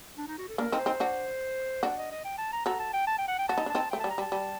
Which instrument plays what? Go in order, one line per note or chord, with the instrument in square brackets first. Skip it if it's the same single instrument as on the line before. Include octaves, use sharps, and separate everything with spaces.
[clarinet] D4
D#4
F#4
A4
[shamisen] A#3 D4 [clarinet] A#4
[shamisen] C4 D#4
[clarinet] C5
[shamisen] C4 D#4
D4 F#4
[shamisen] D4 F#4 [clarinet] D5
[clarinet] D#5
D#5
G5
A5
A#5
[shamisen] F#4 A4 [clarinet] A#5
[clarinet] A5
G5
A5
G5
F#5
G5
[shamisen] F#4 [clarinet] A5
[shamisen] D#4
D4
[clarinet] A5
[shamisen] C4 D#4
[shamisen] A3 [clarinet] G5
[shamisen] G3 [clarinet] A5
[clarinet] A#5
[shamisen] G3
[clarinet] A5
[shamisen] G3